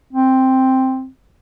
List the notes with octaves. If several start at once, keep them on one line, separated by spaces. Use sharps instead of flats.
C4